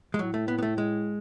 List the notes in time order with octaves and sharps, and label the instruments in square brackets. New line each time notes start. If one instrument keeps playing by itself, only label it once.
[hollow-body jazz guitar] G#3
[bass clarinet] A2 [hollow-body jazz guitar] F#3
[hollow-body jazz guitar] A3
B3
B3
A3
G#3